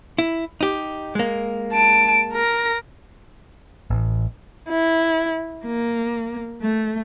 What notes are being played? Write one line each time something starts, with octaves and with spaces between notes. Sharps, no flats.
E4
D#4 G4
G#3 A#3
A5 D7
A#4 A#6
A1
E4
A#3
A3